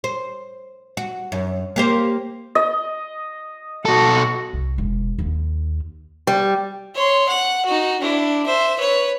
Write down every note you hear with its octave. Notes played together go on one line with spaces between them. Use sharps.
C5
F#4
F#2
A#3 G4 C5
D#5
B2 F#4 A4
C2
E1
D#2
G3
C#5 C6
F#5
D#4 F#4
D4 E4
C5 E5
B4 C#5